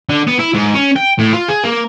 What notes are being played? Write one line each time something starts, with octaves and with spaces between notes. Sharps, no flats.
D3
B3
E4
G#2
C#4
G5
A2
F4
G#4
A#3